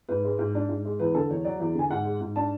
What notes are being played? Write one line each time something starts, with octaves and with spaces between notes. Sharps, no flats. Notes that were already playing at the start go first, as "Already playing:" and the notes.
G#2 B4
G#3
G#2
D4
G#2
G#3
E2 B4
D3 A4
E2 C#5
F#3 D5
E2
D3 G#5
G#2 F#5
G#3
G#2
D4 A5